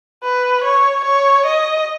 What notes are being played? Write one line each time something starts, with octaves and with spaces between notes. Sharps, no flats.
B4
C#5
C#5
D#5